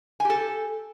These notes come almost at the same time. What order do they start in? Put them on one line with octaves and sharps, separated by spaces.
G#5 G4 A4